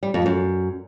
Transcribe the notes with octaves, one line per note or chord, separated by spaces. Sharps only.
G3
F2
F#2